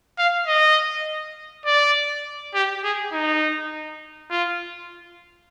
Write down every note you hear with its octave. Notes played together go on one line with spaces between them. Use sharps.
F5
D#5
D5
G4
G#4
D#4
F4